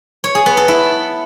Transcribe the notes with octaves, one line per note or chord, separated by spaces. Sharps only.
C#5
G#4
B3
A4
E4